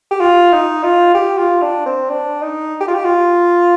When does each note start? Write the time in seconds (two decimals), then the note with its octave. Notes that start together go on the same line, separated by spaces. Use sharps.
0.11 G4
0.21 F4
0.52 D#4
0.84 F4
1.14 G4
1.38 F4
1.62 D4
1.86 C4
2.10 D4
2.42 D#4
2.81 G4
2.88 F4
2.95 G4
3.05 F4